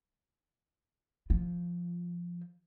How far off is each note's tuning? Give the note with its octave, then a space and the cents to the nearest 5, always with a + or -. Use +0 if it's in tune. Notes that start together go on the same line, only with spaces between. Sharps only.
F3 -5 F4 +0